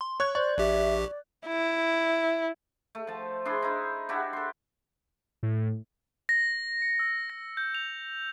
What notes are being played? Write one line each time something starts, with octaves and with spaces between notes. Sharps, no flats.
C6
C#5 C#6 F#6 G#6
C5 D5 C#6
A#1 G4 E5
D5
E4
A3
F3 A5
D4 E4 G#4 C6
D#4 E4
D4 E4 F#4 G4
A4 C6
A2
A#6
C#7
E6
A#6
G6
F7